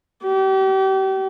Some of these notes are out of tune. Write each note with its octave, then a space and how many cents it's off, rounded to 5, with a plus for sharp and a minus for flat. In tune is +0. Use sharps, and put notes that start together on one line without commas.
G4 -35